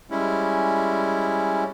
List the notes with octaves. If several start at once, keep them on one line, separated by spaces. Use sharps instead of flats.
G3 G#3 C#4 E4